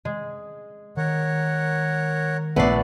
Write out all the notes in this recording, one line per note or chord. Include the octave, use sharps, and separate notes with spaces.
G#3
D#3 A#4 C#5 F#5
A#1 A3 B3 D5 E5 C7